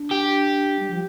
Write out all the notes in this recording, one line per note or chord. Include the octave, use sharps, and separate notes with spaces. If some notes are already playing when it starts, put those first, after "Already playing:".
Already playing: D4
G4
G3
F3